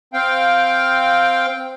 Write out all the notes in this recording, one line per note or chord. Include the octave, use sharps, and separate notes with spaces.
C4 F5 G5